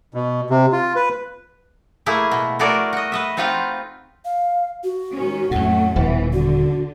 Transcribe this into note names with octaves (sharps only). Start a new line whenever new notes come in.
B2
C3
F4
B4
A3 A#3 E4 G#4 G#5
B2
A3 F#4 G#4 A#4 D5
F#4 D#5
B4 D#5 E5
C4 D#4 F4 F#4 B4 F5
F5
F#4
G#2 D#3 C#4
F2 A2 F#3 A3 C#4 F#5
D#1 B2 E3 F3
D3 F#4